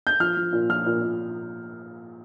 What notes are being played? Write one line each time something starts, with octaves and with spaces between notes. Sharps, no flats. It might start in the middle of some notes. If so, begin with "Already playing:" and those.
G6
F3 F6
F3
A#2
F3 F6
A#2
A#2